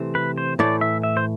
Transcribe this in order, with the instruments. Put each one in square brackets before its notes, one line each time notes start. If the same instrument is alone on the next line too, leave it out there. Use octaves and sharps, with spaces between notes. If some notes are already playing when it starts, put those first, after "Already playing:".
Already playing: [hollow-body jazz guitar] C3 E3 A3 C4
[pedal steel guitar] B4
C5
[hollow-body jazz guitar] A2 E3 A3 [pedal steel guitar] D5
[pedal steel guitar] E5
E5
C5